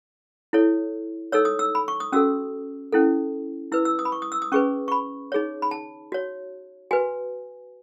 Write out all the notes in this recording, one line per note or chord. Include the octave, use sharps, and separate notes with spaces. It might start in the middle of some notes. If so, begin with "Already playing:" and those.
E4 A4 C#5
D#4 A4 C#5 E6
D#6
E6
B5
C#6
D#6
C#4 F#4 A4 E6
C#4 E4 A4
E4 B4 E6
E6
D#6
B5
C#6
D#6
E6
D#6
C#4 G#4 B4 C#6
C#6
B5
D#4 G#4 C#5
B5
A5
F#4 C#5
F#4 B4 G#5